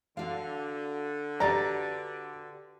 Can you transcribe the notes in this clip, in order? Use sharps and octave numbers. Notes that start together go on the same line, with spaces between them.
D3 F#4 F5
F#4 G4 B4 D5 A#5 A6